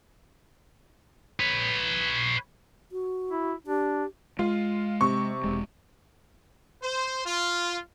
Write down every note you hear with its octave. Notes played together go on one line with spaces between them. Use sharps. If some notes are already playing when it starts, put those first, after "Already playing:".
B4 C#5
F#4
E4
D4 G4
G#3 F4
C3 C#6
E1 G#3
C5
F4